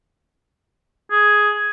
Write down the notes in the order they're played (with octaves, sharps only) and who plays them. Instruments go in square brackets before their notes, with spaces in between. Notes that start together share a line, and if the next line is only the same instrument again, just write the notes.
[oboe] G#4